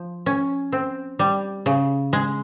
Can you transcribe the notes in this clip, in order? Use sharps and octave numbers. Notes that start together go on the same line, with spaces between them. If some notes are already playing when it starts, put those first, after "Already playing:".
Already playing: F3
C#4
C4
G3
C#3
G#3